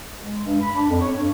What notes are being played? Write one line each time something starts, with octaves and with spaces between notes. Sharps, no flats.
G#3
G2
B5
D4
F2
C#5
G2